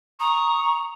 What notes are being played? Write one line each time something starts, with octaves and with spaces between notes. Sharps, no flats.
A#5 C#6 D#6